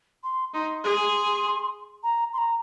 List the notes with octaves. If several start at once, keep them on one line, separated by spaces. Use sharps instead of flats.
C6
D#4 C6
G#4 C6
A#5
C6
A#5